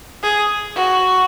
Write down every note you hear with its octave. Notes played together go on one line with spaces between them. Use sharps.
G#4
F#4